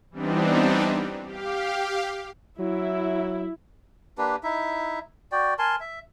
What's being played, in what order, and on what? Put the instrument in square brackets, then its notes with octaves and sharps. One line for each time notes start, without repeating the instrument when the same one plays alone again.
[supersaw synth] E3 G3 B3 C4 D4 D#4
G4 F5
[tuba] F#3 [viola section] E4
[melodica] A#3 D4 G4 B4
D#4 E4 E5
F#4 D5 G5
A#4 G#5 A5 C6
E5